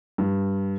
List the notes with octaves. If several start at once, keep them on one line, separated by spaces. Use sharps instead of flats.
G2